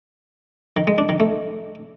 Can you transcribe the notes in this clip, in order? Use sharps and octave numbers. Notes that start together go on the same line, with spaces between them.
D#3
G#3
D4
D#3
A3